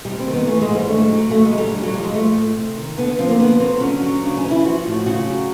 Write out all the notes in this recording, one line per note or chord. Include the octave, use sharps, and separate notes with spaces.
C3 G3
C4
D#3
B3
E3 A3
G#3
G#2
G3
D3 A3
F#3
C#3 A3
G#3
F#3
G3
D3 G3
F#3
F3 G3
G#3
F3 A3
A2
C3
D#3
D3 B3
F3 C4
A#3
D3 B3
F#3 C4
D3 C#4
F#3
C#3 D4
C#4
E3
E4
F3 F#4
A2
C#3 F#4
F#3